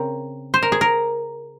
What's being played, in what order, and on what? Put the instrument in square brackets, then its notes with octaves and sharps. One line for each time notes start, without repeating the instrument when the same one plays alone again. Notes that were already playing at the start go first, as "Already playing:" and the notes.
Already playing: [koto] C#3 C4 A#4
C5
A#4
G#4
A#4